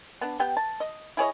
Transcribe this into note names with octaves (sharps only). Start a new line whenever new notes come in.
B3 D4
B3 G4 G5
A5
D#5
E4 G#4 C#5 D#5